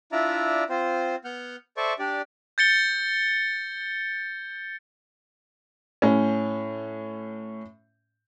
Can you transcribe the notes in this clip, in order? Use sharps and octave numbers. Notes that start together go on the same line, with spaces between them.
D4 E4 F4 D5 E5 A#5
C4 F4 C5
B3 F#5 F6 G6
A4 C5 D5 E5 C#6
D4 G4 D5
G6 A6 C#7 G7
A2 C#4